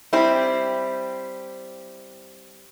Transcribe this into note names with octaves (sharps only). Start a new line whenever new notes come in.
G3 C4 E4